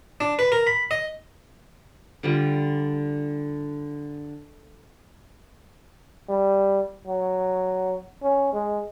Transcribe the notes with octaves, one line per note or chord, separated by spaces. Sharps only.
D4
B4
A#4
B5
D#5
D3 G3 F4
G3
F#3
C#4
G#3